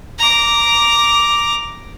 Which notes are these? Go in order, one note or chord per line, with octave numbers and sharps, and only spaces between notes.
A#5 D6